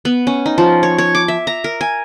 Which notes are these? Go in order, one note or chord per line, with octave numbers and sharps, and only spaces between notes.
B3
C#4
D#4
F3
C#5
C#5
D6
E5
A#5
A#4
G#5